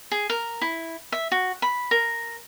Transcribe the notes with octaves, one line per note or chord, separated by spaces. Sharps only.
G#4
A#4
E4
E5
F#4
B5
A#4